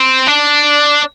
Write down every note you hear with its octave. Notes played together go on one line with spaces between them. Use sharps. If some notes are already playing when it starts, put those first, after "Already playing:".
Already playing: C4
D4